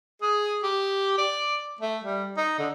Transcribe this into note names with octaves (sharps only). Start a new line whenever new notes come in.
G#4
G4
D5
A3
G3
D#4
D3